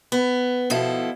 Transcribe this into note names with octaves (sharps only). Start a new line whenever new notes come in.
B3
B2 F3 E4 A4